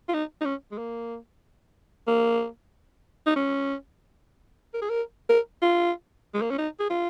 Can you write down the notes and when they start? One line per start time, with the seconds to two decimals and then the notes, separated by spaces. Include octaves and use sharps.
0.08 F4
0.14 D#4
0.41 D#4
0.45 C#4
0.72 G#3
0.78 A#3
2.07 A#3
3.26 D#4
3.36 C#4
4.74 A#4
4.82 G#4
4.89 A#4
5.29 A#4
5.62 F4
6.34 G#3
6.42 A#3
6.50 C#4
6.58 D#4
6.80 G#4
6.90 F4